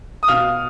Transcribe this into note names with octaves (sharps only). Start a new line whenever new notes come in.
D#6
B2 F5 F6